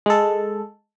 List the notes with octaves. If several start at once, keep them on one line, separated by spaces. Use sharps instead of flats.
G#3 A4